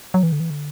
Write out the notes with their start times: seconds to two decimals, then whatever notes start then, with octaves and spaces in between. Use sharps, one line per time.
0.14 F#3
0.23 E3
0.32 D3
0.40 E3
0.50 D3